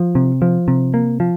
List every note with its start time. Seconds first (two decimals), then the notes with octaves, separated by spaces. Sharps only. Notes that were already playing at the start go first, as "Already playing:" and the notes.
Already playing: F3
0.15 C3
0.42 F3
0.68 C3
0.94 A#3
1.20 F3